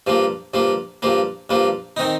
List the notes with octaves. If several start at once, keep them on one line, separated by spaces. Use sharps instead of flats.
G2 F3 A#3
G2 F3 A#3
G2 F3 A#3
G2 F3 A#3
D#3 C4 D#4